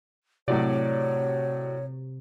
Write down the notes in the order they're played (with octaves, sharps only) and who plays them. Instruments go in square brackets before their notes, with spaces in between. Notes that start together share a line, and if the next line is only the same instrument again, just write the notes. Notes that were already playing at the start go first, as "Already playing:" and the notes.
[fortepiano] A2 F#3 D5 [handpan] C3 [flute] C#5